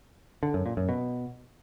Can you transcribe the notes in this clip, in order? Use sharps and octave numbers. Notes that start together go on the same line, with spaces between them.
D3
F#2
A#2
F#2
B2